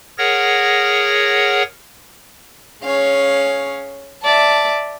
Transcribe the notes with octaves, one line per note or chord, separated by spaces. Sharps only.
G#4 A#4 C#5 F#5 A#6
C#4 G#4 C#5 F5
D5 E5 A5